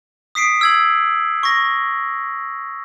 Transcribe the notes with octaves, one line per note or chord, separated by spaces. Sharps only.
D#6 B6 C7 D7
E6 G#6 F#7
C#6 A#6